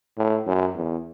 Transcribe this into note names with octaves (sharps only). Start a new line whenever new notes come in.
A2
F#2
E2